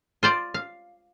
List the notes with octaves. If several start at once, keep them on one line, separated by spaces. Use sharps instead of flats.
F4 C5 D5
F5